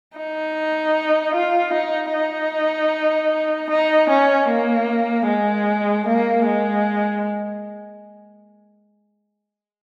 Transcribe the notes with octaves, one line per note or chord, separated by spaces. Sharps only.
D#4
F4
D#4
D#4
D#4
C#4
A#3
G#3
A#3
G#3